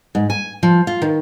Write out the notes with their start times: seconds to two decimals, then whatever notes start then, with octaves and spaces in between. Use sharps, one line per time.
0.15 G#2
0.30 G#5
0.63 F3
0.87 F4
1.02 D#3